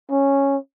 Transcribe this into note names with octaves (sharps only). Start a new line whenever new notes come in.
C#4